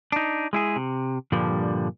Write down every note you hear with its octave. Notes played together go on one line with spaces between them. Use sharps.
D4 D#4
G#3 E4 G#4
C3
G2 A#2 D3 F3 G3